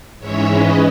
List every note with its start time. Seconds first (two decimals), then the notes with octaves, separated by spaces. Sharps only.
0.19 G#2 E3 G#3 C#4 C#5 E5
0.49 B4 D#5